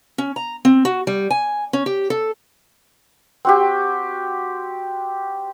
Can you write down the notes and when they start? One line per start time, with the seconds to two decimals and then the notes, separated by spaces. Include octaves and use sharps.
0.18 C#4
0.36 A#5
0.65 C4
0.85 F#4
1.07 G3
1.31 G#5
1.73 C#4
1.86 G4
2.10 A4
3.45 C4 F#4 G4